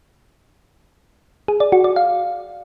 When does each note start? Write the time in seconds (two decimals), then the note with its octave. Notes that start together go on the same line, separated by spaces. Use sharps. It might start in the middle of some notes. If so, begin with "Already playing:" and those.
1.48 G#4
1.60 D5
1.72 F#4
1.84 D5
1.96 F5